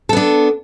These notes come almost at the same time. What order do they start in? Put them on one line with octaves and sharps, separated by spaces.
A4 B3 D4